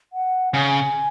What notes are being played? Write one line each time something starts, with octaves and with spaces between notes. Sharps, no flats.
F#5
C#3 G#5